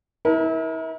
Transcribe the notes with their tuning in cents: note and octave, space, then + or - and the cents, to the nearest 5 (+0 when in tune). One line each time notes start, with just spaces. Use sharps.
E4 -35 A#4 +30 A5 +30